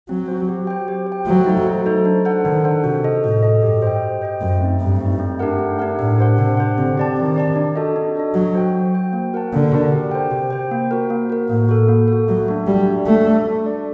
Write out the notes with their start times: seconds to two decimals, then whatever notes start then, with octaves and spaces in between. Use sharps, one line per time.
0.09 F#3 C4
0.28 F#4 C5
0.49 G4
0.67 C5 G5
0.88 G4
1.07 C5
1.12 G5
1.27 F#3 A3
1.46 D#4 A4 C5
1.66 A3
1.86 D#4 A4 C5
2.05 D4
2.25 A4 C5 F#5
2.45 D#3 D4
2.64 A4 C5 F#5
2.84 C3 F#4
3.04 A4 D#5
3.24 A2 F#4
3.43 A4 D#5
3.63 G2 G4
3.82 C5 D#5 G5
4.03 G4
4.22 C5 D#5 G5
4.41 F#2 A3
4.61 C4 D#4
4.80 G2 A3
5.01 C4 D#4
5.20 A3
5.39 D4 G4 A#4 F#5
5.59 A3
5.79 D4 G4 A#4 F#5
5.99 A2 D4
6.18 G4 C5 F#5
6.38 C3 D4
6.57 G4 C5 F#5
6.78 D3 C4
6.98 G4 D5 A5
7.16 D#3 C4
7.36 G4 D5 A5
7.56 D4
7.76 F#4 A4 D#5
7.96 D4
8.15 F#4 A4 D#5
8.34 F#3 F#4
8.55 C5 G5
8.74 F#4
8.94 C5 G5
9.13 A#3
9.33 F#4 A#4 F#5 A5
9.53 D3 A#3
9.72 F#4 A#4 F#5 A5
9.92 G4
10.11 C5 G5
10.31 C3 G4
10.50 C5 G5
10.71 A#3
10.91 F#4 A#4
11.10 A#3
11.30 F#4 A#4
11.49 A2 A#3
11.69 F#4 A4
11.88 A#3
12.08 A4
12.13 F#4
12.28 F#3 A3
12.48 D4 F#4
12.67 G3 A3
12.86 D4 F#4
13.06 A3 D4
13.27 A4 D5
13.46 D4
13.66 A4 D5